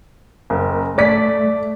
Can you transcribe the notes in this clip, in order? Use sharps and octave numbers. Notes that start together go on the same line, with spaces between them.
F#1
A3 D5 B6